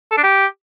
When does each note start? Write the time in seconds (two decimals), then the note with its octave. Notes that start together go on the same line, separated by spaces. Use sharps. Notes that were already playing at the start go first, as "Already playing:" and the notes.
0.12 A4
0.18 D4
0.24 G4